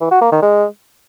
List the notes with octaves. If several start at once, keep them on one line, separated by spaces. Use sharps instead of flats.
E3
F#4
A#3
D#3
G#3